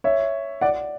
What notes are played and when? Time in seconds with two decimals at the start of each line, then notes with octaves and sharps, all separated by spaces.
0.04 C#5 E5
0.61 D5 F#5